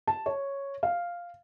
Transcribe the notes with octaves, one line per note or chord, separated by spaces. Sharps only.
A5
C#5
F5